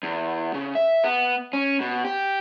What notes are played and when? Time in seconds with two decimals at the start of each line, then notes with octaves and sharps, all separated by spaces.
0.03 E2
0.54 C#3
0.75 E5
1.04 B3
1.53 C#4
1.81 B2
2.05 G4